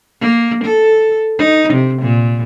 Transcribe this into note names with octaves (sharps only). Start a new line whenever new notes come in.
A#3
A4
D#4
C3
A#2